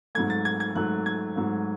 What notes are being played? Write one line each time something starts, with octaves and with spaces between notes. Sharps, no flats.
G#2 F#3 A3 G#6
A6
G#6
G#6
G#2 F#3 A3 F#6
G#6
G#2 F#3 A3